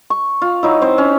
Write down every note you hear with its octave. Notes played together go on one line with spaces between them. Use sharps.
C#6
F4
F#3 D#4 E4
C4 C5
C#4